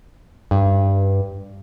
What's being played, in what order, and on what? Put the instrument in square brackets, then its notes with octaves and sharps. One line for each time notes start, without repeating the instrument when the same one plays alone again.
[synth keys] G2